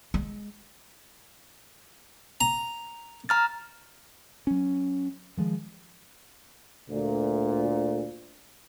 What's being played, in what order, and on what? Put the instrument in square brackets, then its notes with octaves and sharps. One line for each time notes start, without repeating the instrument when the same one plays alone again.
[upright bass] G#3
[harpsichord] A#5
[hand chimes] A#5 F6 A6
[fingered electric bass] F#3 C#4
D#3 F3 G#3
[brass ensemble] D2 A#2